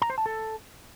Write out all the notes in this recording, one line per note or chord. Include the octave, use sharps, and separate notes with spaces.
A#5
C5
A5
A4